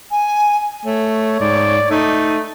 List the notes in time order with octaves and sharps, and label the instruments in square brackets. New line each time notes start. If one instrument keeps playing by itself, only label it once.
[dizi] G#5
[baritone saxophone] A3 [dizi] C#5
[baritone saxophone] G#2 [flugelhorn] D5
[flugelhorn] A3 [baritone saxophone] D#4